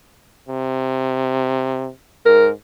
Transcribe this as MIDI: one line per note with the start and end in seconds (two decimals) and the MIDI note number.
0.48 1.89 48
2.26 2.53 44
2.26 2.48 70